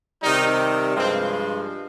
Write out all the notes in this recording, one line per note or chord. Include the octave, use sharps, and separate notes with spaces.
C3 D#3 G3 D#4
G2 F3 G#3 C4